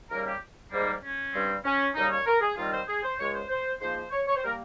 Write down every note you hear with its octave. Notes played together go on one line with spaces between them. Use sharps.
D#2 C#3 G3 A#3 A#4
G4
G#2 G3 A#3
C#4
G2 G3 C4
C#4
D#2 C#3 G3 A#3 D#4
C#5
A#4
G#4
D#2 D#3 G3 C4 F4
C5
G#4
C5
C#2 C#3 G#3 C#5
C5
C5
G#2 F3 A#3 C5
C5
C#5
C#5
C5
G3 A#3 A#4